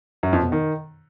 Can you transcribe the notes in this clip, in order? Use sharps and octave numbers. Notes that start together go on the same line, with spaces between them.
F#2
F2
B2
D#3